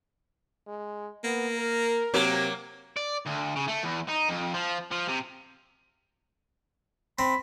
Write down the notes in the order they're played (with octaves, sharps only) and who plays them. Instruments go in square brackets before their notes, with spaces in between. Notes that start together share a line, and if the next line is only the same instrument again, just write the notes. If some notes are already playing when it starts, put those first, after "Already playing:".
[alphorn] G#3
[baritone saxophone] A#3 [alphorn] B3
[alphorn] A#4
[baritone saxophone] C3 [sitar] F#3 A#3
[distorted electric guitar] D5
D2
C#3
A3
E2
D#4
F2
F3
F3
C3
[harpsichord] C4 [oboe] B5